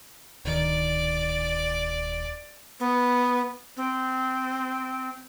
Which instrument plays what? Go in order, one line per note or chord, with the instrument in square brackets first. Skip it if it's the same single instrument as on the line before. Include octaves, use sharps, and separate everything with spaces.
[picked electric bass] D1 D#3 [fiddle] D5
[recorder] B3
C4